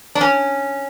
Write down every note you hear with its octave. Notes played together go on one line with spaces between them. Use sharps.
D4
C#4